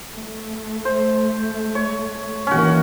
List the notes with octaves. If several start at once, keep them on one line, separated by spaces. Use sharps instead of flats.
A3
C5
C#5
D#3 E3 A#3 C#4 F#4